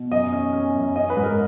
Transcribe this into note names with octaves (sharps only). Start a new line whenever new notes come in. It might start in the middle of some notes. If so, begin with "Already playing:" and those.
Already playing: B2
F#2 D#5
C#4
C#4
F#2
C#4 D#5
B4
G#2
A#4